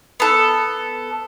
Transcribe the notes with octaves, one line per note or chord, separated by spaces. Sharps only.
B3 A4